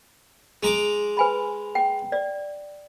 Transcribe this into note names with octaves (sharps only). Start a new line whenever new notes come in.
G#3 A#5 D6
B4 G#5 B5
G5
D5